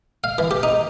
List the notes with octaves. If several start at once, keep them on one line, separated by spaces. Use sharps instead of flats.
F5
E3
G4
D#4